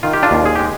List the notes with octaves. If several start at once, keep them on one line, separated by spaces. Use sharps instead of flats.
D#3 F4
G4
D4 F4
D#2
G#4
G#3 G4